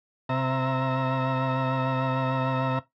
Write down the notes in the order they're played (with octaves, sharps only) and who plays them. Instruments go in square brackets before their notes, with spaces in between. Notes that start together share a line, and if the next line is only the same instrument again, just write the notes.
[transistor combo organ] C3 E5 A#5